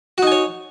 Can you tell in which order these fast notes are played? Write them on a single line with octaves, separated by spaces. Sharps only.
F#4 D#4 G#5 C#5